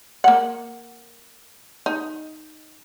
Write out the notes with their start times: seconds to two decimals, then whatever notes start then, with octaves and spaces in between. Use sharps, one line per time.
0.24 A#3 F#5
1.86 D#4